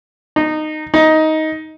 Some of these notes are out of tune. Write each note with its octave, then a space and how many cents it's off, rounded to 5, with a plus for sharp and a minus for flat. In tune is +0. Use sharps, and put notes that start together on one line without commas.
D#4 -15
D#4 +15